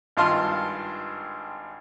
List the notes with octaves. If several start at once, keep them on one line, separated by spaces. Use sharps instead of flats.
G#1 G2 F4 A5 C6 F6